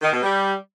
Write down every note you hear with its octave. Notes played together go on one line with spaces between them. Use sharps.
D#3
B2
G3